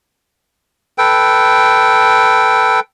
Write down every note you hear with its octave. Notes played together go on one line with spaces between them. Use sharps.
A4 B4 G5